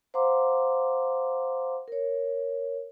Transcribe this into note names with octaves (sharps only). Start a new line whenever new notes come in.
C5 F5 F#5 A#5 C6 D6
A#4 C#5